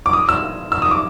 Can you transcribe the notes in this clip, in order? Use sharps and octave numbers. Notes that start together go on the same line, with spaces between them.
D6
D#6
E6
E6
D#6
D6